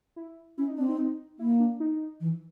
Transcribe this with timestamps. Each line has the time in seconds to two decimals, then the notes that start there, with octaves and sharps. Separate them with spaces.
0.16 E4
0.58 C#4 E4
0.67 D#4
0.78 C4 D4
0.88 D#4
0.98 D#4
1.39 A#3 E4
1.60 D4
1.80 D#4
2.21 E3